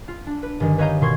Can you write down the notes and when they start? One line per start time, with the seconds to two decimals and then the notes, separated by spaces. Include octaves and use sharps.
0.08 F4
0.27 D4
0.43 B4
0.60 G1 D#3
0.78 B4 C#5 D#5 F5 A#5 G6
1.01 B2 D#3 C6 C#6 G#6